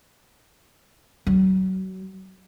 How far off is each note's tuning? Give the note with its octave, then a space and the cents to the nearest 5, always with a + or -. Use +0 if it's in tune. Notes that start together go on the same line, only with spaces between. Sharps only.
F#3 +30